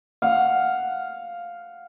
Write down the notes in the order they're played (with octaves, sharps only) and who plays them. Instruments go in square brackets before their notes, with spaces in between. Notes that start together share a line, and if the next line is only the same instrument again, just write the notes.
[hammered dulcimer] F5 F#5